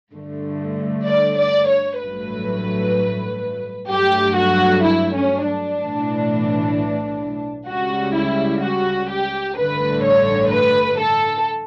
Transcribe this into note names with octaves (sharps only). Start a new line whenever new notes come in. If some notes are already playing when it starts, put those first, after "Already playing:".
G2 D3 A3
D5
D5
C#5
A1 G2 F#3 A3 B4
G2 F#3 A3 G4
F#4
E4
C#4
D4
B1 A2 E3
C#2 C#3 G3 F#4
E4
F#4
G4
A1 G2 D3 A3 B4
C#5
B4
A4